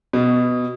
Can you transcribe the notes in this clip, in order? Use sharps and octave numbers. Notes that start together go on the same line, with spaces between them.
B2